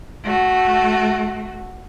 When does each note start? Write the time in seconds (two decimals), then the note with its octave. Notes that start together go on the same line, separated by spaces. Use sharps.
0.24 A3 F#4